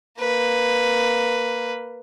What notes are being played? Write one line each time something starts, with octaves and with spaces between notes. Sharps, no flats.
A#3 B4